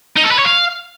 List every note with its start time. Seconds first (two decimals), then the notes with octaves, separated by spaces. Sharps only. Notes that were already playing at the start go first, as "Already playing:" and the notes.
0.16 D#4
0.24 A4
0.31 B4
0.39 C#5
0.46 F5